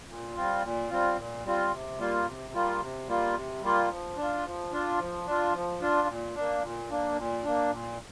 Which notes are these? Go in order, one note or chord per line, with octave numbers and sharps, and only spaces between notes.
A#2
G3 C4 F4
A#2
G3 C4 F4
A#2
G3 C4 F4
C3
G3 A#3 F4
C3
G3 A#3 F4
C3
G3 A#3 F4
C3
G3 A#3 F4
F3
D4
F4
F3
D4 F4
F3
D4 F4
F3
D4 F4
A#2
A#3 D4
A#2
A#3 D4
A#2
A#3 D4
A#2